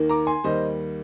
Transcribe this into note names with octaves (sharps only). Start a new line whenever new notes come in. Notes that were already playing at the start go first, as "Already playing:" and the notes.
Already playing: D#2 D#3 A#3
A#5 D6
G#5 C6
D#2 D#3 G3 C5 D#5